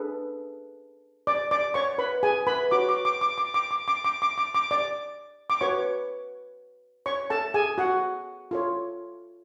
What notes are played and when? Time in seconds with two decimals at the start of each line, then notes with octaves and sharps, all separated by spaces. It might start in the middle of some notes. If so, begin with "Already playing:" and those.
Already playing: D4 G#4 A4 B4
1.27 D5 D6
1.51 D5 D6
1.74 C#5 C#6
1.98 B4 B5
2.23 G#4 G#5
2.47 B4 B5
2.71 F#4 C#5 D6
2.89 D6
3.05 D6
3.21 D6
3.38 D6
3.54 D6
3.71 D6
3.88 D6
4.04 D6
4.22 D6
4.38 D6
4.54 D6
4.71 D5 D6
5.50 D6
5.61 F#4 B4 C#5 C#6
7.06 C#5 C#6
7.30 A4 A5
7.54 G#4 G#5
7.78 F#4 F#5
8.51 F4 A4 C#5